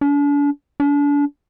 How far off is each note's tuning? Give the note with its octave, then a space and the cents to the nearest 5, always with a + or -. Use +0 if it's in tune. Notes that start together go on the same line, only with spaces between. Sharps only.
D4 -40
D4 -35